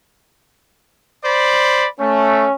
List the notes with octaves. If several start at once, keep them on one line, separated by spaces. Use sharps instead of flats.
C5 D5 B5
A3 C#4